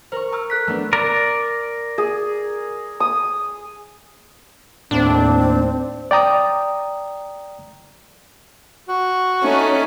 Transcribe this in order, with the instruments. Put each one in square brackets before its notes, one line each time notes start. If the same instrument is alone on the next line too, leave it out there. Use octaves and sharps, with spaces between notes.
[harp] A#4 C#6 [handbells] C5
[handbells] A#5 E6 F6
A4 F#6 B6
[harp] A3 B3 D4
[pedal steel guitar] A#4 D5 A#5
[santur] G#4
D#6
[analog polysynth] D#2 A2 [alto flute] C4 [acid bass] D4
[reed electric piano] D5 G5 A#5 D#6
[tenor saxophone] F#4
[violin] A3 D#4 [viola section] C#4